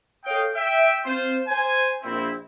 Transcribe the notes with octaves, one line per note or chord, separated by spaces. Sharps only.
A4 C#5 D#5 F5 G5
E5 G5
C4 F4 C5
C5 G#5
A#1 C4 E4